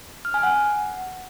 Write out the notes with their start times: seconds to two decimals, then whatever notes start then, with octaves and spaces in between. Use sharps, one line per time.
0.25 F6
0.34 G#5
0.43 F#5